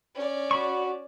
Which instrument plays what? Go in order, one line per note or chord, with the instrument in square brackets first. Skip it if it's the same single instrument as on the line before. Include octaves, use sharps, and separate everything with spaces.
[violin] C#4 D5
[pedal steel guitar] F#4 B5 C#6